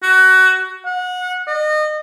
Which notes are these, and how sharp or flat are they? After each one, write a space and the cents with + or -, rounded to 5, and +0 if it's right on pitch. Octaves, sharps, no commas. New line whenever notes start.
F#4 +20
F#5 -30
D#5 -30